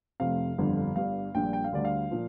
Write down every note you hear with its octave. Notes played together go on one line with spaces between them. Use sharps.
F1 F2 C3 F5
G1 F2 D3 G3
G1 G2 G3 F5
A#1 A#2 G3 G5
G5
F5
D2 D3 G3 D5
F5
A#2 F3